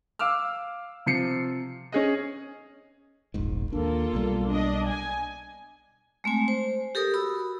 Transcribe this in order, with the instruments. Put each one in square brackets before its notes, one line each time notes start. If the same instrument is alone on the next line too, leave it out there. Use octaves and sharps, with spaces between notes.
[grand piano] F5 D6 E6 F6
C3 F3 C7 C#7
C#4 G#4 D#5
[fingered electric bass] E1 A#1 G#2
[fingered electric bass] D#2 D4 [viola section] A#3 F4 A4
[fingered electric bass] B1 B2 G3
[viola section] D4 D#5
G#5
[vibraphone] G#3 A3 C4 G#5
C5
G4 A4 A#4 D#6
F#4 B5 D#6 E6